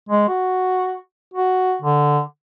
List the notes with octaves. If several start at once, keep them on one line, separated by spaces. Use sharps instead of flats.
G#3
F#4
F#4
D3